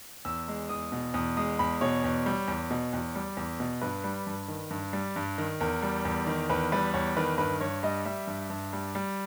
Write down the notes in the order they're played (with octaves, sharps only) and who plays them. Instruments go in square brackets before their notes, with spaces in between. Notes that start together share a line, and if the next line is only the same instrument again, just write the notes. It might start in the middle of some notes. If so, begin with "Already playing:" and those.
[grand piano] E2 E6
G#3
E2 D#6
B2
E2 D#6
G#3 D#6
E2 B5
B2 C#5
E2
G3
E2
B2
E2
G3
E2
B2
G2 B4
G3
G2
D#3
G2
G3
G2
D#3
E2 A#4
G3
E2
D#3
E2 B4
G3 B4
E2 C#5
D#3 B4
G2 B4
G2 C#5
G3 D#5
G3 E5
G2
G2
G3
G3